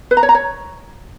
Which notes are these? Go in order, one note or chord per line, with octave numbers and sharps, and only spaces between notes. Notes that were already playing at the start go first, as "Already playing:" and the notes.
B4
A#5
C#5
A#5
C#5